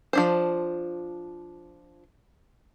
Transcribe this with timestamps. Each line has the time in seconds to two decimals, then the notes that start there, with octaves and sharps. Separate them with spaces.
0.13 F3 D4 C5